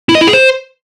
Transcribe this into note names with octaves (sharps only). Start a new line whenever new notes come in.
E4
D#5
E4
G#4
C5